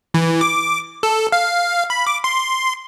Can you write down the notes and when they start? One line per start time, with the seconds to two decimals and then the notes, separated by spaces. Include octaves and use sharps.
0.14 E3
0.41 D6
1.03 A4
1.32 F5
1.90 B5
2.07 D6
2.24 C6